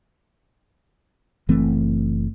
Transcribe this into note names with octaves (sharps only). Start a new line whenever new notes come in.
F#1 E3 A3 C4